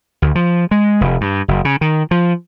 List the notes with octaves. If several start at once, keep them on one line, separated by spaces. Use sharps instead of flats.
D2
F3
G#3
F1
G2
F#1
C#3
D#3
F3